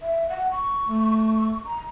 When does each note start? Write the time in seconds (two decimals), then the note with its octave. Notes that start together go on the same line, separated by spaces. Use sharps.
0.01 E5
0.29 F#5
0.51 C#6
0.87 A3
1.66 A#5